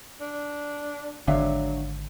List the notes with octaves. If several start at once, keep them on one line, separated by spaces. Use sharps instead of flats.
D4
G#1 D3 F#3 D4 E5 F5